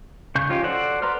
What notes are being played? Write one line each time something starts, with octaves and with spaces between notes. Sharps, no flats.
C#3 C#6 G6
F3 C#4 D#4 F4 G4
F#4 A4 C5 D5 F#5
B4 D5 A#5 C6 F6